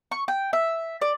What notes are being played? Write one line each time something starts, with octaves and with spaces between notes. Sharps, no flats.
C#6
G5
E5
D5